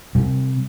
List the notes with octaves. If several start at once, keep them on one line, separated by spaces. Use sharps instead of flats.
C3 G3